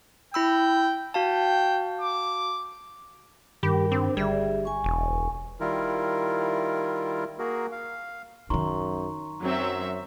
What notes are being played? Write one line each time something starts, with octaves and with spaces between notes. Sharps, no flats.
E4 G5 B5 E6
F#4 F5 G5 A5
D6
G2 D#3 G3 G4 A#4 B5
C4 D4
G1 G3 G#4 E5
G#5 C#6
E1
D#3 G3 E4 F4 A#4
A#3 F#4 G#4 A#4
F5
F#2 D#3 D#4 A#5 C6 C#6
F#2 F#3 C4 E5